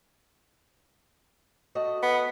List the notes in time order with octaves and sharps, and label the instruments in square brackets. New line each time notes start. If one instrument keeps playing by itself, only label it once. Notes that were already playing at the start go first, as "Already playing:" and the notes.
[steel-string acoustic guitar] A3 F#4 D#5
[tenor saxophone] B3